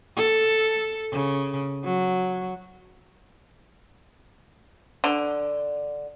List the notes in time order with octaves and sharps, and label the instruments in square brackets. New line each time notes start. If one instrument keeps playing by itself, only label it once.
[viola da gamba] A4
C#3
F#3
[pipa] D3